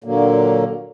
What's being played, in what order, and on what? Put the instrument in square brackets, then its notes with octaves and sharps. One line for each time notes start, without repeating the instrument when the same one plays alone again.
[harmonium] A#2 D3 F#3 A#3